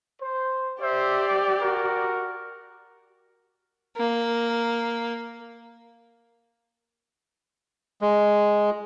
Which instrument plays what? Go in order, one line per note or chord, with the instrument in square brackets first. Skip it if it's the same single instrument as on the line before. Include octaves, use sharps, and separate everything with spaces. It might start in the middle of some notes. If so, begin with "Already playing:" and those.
[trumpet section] C5
[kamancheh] G4 D5 [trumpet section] C5 E5
[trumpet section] F#4 A#4
[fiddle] A#3
[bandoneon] G#3